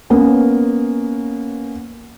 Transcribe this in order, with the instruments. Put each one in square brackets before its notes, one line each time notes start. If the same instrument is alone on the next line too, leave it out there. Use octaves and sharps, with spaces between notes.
[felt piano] A#3 B3 C#4